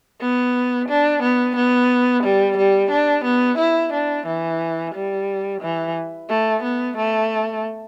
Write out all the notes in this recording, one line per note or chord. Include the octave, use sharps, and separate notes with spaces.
B3
D4
B3
B3
G3
G3
D4
B3
E4
D4
E3
G3
E3
A3
B3
A3